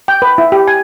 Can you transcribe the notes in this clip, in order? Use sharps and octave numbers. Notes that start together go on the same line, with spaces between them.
G5
B4
E4
G4
G#5